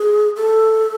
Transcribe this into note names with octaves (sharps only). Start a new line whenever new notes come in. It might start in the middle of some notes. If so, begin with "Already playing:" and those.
Already playing: G#4
A4